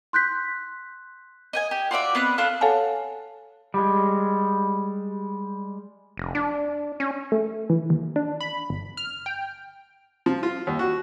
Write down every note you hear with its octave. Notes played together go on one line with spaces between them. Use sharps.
C6 F#6 G6 B6
D#5 G5 G#5
G4
F4 F#4 D5 E5
B3 C4 D#5 F#6
D4 F4 A4 F#6
A4 C#5 F5 F#5 G#5 A5
G3 G#3
F1
D4
C#4
A3
E3
D#2
D4
B5
G1
F6
G5
F3
F4
D#2
F#4